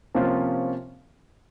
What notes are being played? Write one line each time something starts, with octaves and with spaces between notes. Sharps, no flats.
C3 F3 A#3 C#4 F4